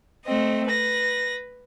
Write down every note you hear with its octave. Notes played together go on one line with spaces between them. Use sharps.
A3 C4 D#5
B4 A#6